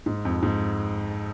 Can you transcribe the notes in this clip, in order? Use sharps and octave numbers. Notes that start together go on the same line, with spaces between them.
G#2
F2
G#2